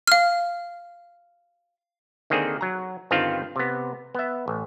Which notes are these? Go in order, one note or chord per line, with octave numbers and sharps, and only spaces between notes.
F5 F6
D3 D#3 A#3 C4 G#4
F#3 A#5
G1 G2 D#3 C4 F4 F5
C3 B3
B3 E5
A1